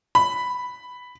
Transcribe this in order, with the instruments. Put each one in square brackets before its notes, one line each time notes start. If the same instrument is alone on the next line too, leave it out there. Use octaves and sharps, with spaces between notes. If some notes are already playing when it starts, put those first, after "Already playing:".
[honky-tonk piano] B5